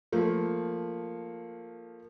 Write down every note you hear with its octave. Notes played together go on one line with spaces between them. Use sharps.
F3 A3 A#3